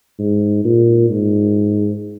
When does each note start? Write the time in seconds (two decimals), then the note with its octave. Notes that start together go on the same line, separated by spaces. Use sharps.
0.19 G#2
0.65 A#2
1.10 G#2